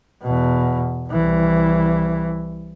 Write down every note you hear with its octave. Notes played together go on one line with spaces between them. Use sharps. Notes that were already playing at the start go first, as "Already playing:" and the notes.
E2 B2
C2 E3